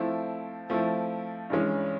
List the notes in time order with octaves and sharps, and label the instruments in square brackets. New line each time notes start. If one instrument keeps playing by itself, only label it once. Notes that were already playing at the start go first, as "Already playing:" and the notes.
Already playing: [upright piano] F3 A3 C4 E4
F3 A3 C4 E4
G2 E3 G#3 C#4